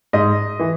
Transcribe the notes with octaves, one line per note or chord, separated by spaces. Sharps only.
G#2 D#5
E3